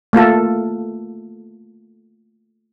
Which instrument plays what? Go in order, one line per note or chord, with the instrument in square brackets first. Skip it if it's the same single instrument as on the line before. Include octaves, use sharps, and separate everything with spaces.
[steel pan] A3 A#3 F4 A4